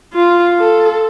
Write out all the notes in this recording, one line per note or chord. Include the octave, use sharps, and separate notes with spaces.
F4
A4